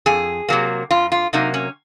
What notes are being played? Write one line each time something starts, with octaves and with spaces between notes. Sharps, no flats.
F2 G#4
C3 F#3 A#3
F2 F4
F4
C3 F#3 A#3 D#4
C#4